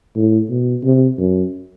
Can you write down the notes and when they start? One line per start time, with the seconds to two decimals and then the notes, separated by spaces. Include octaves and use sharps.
0.15 A2
0.50 B2
0.84 C3
1.19 F#2